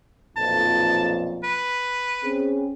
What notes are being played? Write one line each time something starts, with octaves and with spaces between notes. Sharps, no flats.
B1 F2 A#2 A5
B4
C4 C#4 G#4